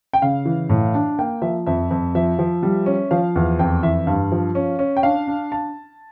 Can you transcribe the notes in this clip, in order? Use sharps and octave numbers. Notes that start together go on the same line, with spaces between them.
G5
C#3 F5
E3
A2
D4
A#3 G5
F3 E5
F2 E5
F2
F3 E5
F3
G3
C#4
F3 F5
E2
F2 G5
E3 E5
G2 F5
F3
C#4
C#4
G5
D4 F5
D4
A5